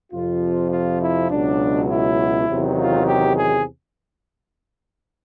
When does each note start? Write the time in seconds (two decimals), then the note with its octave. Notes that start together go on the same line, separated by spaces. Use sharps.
0.12 F2 C3 F3 F4
0.71 F4
1.00 E4
1.30 C#2 B2 F#3 D4
1.89 E4
2.47 E2 C3 D#3 F#3
2.77 F4
3.06 G4
3.35 G#4